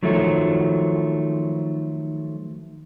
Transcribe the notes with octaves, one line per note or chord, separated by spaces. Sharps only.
D#3 F3 F#3 A3